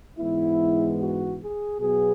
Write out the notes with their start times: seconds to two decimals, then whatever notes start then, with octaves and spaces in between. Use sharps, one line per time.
0.19 G#2 E3 G#3 B3 E4
0.99 F#4
1.41 G#4
1.80 B2 F#3 B3 G#4